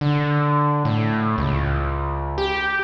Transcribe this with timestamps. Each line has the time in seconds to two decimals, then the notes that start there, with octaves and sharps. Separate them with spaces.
0.01 D3
0.85 A2
1.38 C#2
2.38 G4